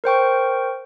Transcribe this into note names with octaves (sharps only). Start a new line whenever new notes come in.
A#4 C5 G5 C#6